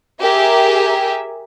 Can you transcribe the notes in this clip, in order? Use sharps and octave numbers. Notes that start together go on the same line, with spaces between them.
G4 G#4 A#4 E5